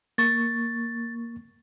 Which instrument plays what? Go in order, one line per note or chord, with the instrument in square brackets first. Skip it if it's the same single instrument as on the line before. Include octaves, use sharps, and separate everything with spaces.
[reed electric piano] A#3 C#6 [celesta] A6